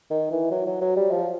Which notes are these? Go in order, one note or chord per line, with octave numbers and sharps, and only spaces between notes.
D#3
E3
F#3
F#3
F#3
G3
F3